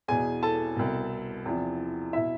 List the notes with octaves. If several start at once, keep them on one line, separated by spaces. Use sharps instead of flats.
E2 B2 G#4 G#5
A4 A5
C2 B2
E2 C3 F3
B2 E4 E5